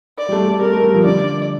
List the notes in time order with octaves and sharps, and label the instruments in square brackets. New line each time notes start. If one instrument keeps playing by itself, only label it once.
[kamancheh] D5
[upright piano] G3
A3
A3
[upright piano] A3 [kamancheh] A#4
[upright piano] A3
G3
F3
[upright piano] D3 [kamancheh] D5